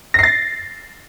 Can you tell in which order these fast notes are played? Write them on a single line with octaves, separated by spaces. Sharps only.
A#6 C7 A6